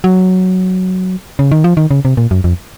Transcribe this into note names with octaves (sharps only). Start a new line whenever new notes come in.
F#3
C#3
D#3
F3
D#3
C#3
C3
A#2
F#2
F2